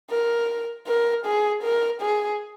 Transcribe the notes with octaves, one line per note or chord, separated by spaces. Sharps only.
A#4
A#4
G#4
A#4
G#4